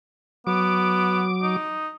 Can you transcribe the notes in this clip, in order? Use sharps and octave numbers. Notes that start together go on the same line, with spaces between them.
F#3 B3 D6
D#4